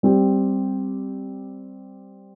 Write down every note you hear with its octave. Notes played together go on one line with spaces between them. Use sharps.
G3 C4 G4